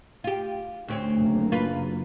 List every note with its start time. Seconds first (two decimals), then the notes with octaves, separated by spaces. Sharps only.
0.24 F4 G4
0.88 D2 C4 C#4
1.19 F#1 A#3
1.52 F4 B4